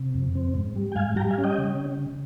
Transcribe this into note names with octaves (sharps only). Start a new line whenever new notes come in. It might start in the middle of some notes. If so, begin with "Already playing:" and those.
Already playing: C3
F2
C4
G#2
G3
G5
G#2 F5 G#5
G3 G5 A#5
F5 G#5
C#4
D#5 G5
C#3